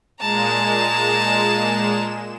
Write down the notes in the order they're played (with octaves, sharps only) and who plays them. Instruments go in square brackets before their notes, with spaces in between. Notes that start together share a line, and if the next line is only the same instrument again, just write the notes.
[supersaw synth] A#2 G#3 E7 [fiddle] A5 A#5